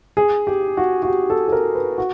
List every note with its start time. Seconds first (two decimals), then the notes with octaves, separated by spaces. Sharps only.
0.17 G#4
0.47 G4
0.77 F#4
1.03 F#4
1.08 G4
1.30 A4
1.48 A4
1.52 A#4
1.75 B4
1.98 F#4